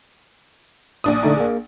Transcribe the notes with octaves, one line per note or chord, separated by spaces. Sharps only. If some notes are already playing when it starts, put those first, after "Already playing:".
A#1 D4 D#6
D3 A3 D#4
A#3 G#4